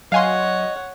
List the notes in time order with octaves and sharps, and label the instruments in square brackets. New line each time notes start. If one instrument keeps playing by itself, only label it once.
[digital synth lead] F#3 [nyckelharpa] C#5 F#5 [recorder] D#5 [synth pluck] F5 G#5 C6